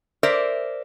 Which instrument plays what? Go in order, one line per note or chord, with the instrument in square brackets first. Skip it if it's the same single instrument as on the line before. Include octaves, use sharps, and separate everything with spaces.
[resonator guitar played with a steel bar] A#4 C5 D5 E5